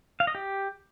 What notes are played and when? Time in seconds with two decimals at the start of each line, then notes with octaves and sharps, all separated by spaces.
0.20 F5
0.27 D#5
0.35 G4